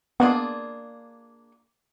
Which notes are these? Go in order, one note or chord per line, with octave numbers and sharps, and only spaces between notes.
A#3 B3 D4 F4 G#4